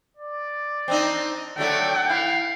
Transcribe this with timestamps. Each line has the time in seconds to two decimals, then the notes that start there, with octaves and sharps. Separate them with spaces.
0.17 D5
0.88 C4 D4 D#4
1.58 D3 F#3 A3 A4 G5
2.10 E4 F5